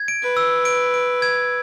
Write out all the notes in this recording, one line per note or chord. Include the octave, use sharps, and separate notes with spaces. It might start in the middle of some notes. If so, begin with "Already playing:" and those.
Already playing: G#6
D7
B4
E6
D7
D7
G#6